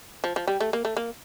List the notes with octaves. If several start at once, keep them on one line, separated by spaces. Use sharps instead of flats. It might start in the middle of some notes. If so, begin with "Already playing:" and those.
F3
F3
G3
A3
A#3
A3
A#3